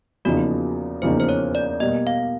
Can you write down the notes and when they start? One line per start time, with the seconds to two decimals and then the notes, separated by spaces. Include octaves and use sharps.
0.25 E2 C#3 F3 A#3 D#4 F#4
1.02 E2 C#3 F3 A#3 D#4 C5
1.20 C5
1.29 C#5
1.55 D5
1.80 B2 G3 A#3 D#5
2.07 F5